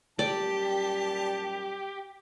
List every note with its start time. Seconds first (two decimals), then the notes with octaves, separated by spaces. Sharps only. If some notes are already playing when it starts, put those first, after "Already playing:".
0.19 F#2 A#2 G3 G4 D5 A5